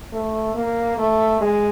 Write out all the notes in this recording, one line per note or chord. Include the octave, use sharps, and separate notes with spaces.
A3
A#3
A3
G#3